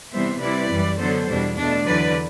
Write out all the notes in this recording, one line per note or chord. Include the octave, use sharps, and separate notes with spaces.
C3 E3 G3 B3 C5 E5
C3 G3 C4 E4 B4 D5
F#2 E3 G3
D3 F#3 B3 A4 C5
E2 B2 G3 D4
B2 A3 D4
E2 D3 F#3 B4 D5